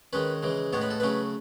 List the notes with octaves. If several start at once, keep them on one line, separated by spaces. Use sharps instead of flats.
D#3 G#3 C#4 B4
C#3 E3 G#3
A2 G#3 B3 C#5
B4
A4
C#3 F#3 A3 C#4 B4